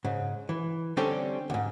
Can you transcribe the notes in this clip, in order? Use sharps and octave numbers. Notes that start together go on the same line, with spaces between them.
G#2 C#3
E3
D3 G3 C4 C#4 G4 A4
D2 G#2